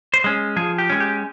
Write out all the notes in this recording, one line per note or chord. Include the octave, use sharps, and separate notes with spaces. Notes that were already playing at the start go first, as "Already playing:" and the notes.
C5
G#3 C#4
F3 G#4
G4
G#3 C#4
G4